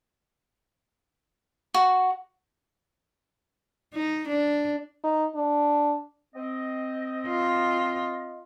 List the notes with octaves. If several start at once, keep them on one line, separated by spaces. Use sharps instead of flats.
F#4
D#4
D4
D#4
D4
C4 D#5
F4